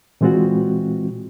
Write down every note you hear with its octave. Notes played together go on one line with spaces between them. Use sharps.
A#2 E3 G#3 C4 F4 F#4